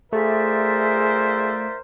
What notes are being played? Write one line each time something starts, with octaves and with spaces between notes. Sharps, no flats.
A3 F4 G#4 A#4 C5 D5 E5